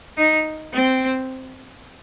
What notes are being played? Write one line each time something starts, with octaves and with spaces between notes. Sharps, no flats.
D#4
C4